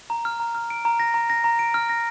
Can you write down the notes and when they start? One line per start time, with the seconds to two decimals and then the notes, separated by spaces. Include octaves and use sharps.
0.10 A#5
0.25 F6
0.40 A#5
0.55 F6
0.70 D7
0.85 A#5
1.00 A#6
1.14 A#5
1.30 A#6
1.44 A#5
1.59 D7
1.74 F6
1.89 A#6